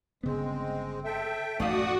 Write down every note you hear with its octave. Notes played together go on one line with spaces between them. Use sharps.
G1 C#3 G#3 B3 C4
A4 E5 G5
A1 F#2 A3 D#4 F#4 D5 F5 D#6